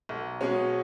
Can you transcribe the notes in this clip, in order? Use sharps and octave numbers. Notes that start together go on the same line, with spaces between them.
B1
B2 G#3 C#4